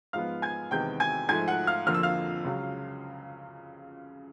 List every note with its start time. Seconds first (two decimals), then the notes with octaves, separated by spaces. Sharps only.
0.13 G#2 F3 G#3 B3 F5 F6
0.42 G#5 G#6
0.71 E2 C3 D#3 G#3 B3 G5 G6
1.00 G#5 G#6
1.28 G#2 F3 A3 G#5 G#6
1.48 F#5 F#6
1.67 F5 F6
1.87 F2 D3 F3 A#3 F6
1.95 E6
2.03 F5 F6
2.45 C#2 C#3 F#3